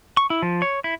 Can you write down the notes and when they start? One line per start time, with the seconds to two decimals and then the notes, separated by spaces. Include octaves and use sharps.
0.17 C#6
0.30 E4
0.42 F3
0.62 C#5
0.84 E4